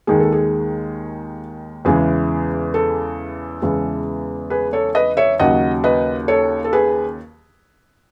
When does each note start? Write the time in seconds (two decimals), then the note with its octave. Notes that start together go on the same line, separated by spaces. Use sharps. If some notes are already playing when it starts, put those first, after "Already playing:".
0.07 D#2 D#3 G#3 G#4
0.20 A4
0.32 G#4
1.85 E2 C#3 E3 G#3 G#4
2.74 A4
3.62 E2 C#3 E3 G#3
4.50 G#4 B4
4.73 A4 C#5
4.95 B4 D#5
5.17 C#5 E5
5.39 D#2 C#3 F#3 D#5 F#5
5.84 B4 D#5
6.28 A4 C#5
6.64 A4
6.73 G#4 B4